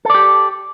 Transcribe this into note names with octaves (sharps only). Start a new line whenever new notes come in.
G4 A4 D5